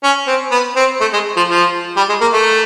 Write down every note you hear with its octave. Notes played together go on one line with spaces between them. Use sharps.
C#4
C4
B3
C4
A3
G#3
F3
F3
G3
G#3
A#3
A3